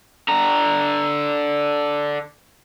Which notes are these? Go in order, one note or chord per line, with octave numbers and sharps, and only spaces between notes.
D3 A#5